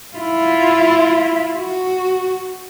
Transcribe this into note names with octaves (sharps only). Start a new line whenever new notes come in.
E4 F4
F#4